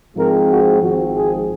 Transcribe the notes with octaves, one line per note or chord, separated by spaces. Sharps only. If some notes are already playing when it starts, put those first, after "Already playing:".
G#2 F3 G#3 C4 A#4
F#4
G#1 G#2 F3 C4 F#4
G#4